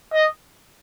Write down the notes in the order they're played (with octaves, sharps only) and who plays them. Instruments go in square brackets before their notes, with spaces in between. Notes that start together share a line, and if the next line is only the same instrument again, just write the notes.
[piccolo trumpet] D#5